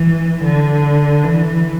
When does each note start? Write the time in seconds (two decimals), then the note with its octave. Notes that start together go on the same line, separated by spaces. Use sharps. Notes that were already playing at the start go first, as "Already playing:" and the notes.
Already playing: E3
0.44 D3
1.23 E3